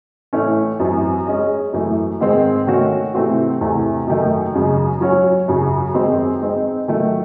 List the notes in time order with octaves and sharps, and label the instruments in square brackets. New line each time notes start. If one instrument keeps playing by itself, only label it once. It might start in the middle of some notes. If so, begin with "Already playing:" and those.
[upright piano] A2 E3 A3 C#4
F#2 E3 C4
G#3 C#4 G#4 D#5
F#2 E3 A3
G#2 D#3 G#3 C4
D#3 A3 C#4 F#4
C3 E3 A3 C4 F#4
E2 C3 E3 A3
F#2 D#3 A3
F#2 C#3 G#3
F#3 C#4 F#4 C#5
F#2 C#3 F#3
F#2 D#3 G#3 C4
G#3 C4 D#4
D#3 F#3 A3